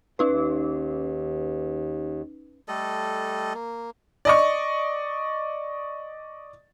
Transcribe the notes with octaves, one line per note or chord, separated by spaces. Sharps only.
D#2 C#4 D#4 B4
G3 A3 A4 D#5
A#3
D5 D#5 C#6